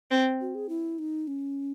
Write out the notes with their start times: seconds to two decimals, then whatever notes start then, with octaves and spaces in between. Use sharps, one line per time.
0.11 C4
0.41 F#4
0.55 G#4
0.69 E4
0.99 D#4
1.27 C#4